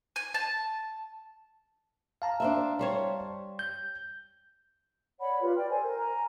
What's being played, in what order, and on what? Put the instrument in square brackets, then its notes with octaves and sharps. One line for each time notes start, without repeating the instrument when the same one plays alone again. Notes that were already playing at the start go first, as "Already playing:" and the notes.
[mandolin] G#5
A5
[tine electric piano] F5 A5 A#5
[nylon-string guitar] D4 C5 E5
G3 C5 C#5
[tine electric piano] G6
[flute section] C#5 D5 F#5 B5
F4 G4 B4
D5 G5
A4 C5 G#5
A#4
G#5 A#5